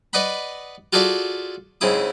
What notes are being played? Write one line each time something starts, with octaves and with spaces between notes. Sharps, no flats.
B4 D5 D#5 F#5 B5
F4 F#4 G#4 A4 D5 E5
G#2 C#3 C4 E4 D#6